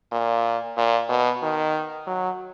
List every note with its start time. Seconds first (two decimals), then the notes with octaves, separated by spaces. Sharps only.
0.12 A#2
0.77 A#2
1.09 B2
1.42 D#3
2.07 F#3